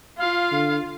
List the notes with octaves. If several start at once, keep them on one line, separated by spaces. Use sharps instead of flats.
F4 F5
D3